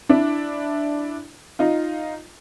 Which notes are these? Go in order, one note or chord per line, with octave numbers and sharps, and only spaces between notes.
D4 E4
D#4 F4